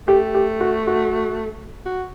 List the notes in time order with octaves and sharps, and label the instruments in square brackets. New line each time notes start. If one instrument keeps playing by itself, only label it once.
[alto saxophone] A3 [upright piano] G4
[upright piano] G4
F#4
F#4
[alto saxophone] F#4